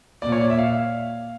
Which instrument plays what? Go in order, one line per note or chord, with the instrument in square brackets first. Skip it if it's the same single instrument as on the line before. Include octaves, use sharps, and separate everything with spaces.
[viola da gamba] A#2 [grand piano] D5
[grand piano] C#5
D5
E5
F5